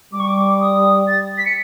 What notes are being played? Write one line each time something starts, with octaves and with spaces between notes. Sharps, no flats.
G3 D6
C#6
D6
D#6
A6
B6
C#7